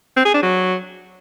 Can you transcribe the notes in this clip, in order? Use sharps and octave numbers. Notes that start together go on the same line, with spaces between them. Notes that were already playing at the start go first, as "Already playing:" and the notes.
C4
G#4
D4
F#3